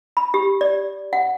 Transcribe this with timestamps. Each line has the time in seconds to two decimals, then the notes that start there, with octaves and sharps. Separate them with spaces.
0.17 B5
0.34 G4
0.61 D5
1.13 F#5